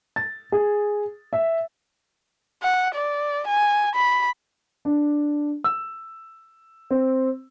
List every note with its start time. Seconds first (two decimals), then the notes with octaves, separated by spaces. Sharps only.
0.16 A6
0.52 G#4
1.33 E5
2.62 F#5
2.95 D5
3.47 G#5
3.95 B5
4.85 D4
5.64 E6
6.91 C4